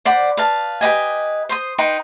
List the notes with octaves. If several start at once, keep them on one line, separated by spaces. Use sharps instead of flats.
C5 D5 F#5 B5
B4 F5 A5
G4 B4 D#5 G#5
C5 C6 D#6
D#4 B4 G5 C6